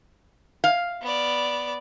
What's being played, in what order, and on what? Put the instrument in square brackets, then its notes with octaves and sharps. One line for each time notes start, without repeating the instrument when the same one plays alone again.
[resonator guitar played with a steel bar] F5
[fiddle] B3 D5